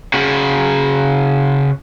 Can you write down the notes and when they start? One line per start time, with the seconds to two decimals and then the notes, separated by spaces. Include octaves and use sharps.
0.14 C#3 F#4